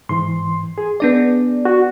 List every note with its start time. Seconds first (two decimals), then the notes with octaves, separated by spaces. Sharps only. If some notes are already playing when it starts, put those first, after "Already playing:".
0.09 G#2 E3 C6
0.78 G#4
1.00 B3 D4 D5
1.65 F#4